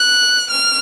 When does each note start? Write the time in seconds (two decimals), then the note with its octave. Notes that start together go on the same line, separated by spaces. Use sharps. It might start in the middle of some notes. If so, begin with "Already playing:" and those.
Already playing: F#6
0.51 F6